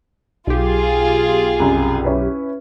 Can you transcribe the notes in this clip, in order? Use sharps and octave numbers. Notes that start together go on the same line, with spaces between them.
B1 F4 G4 G#4
C2 F#2
C#4 E4 B4